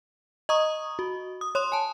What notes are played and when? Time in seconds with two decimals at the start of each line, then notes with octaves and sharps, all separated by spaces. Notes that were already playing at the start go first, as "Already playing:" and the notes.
0.49 D#5 A#5 C#6 D#6
0.99 F#4
1.41 D#6
1.55 C#5 C6 D#6
1.72 G#5 A5